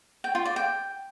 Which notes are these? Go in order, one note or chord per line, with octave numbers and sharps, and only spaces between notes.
G5
F4
D5
G5